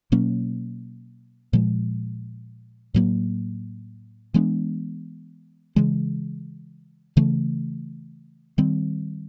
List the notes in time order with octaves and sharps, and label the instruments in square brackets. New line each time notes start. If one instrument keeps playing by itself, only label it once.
[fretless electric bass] B2 F#3 A#3 C#4
A#2 F3 G#3
A2 F#3 A#3
E3 G#3 B3 D4
C#3 E3 G#3
C#3 E3 A3
D#3 G3 C4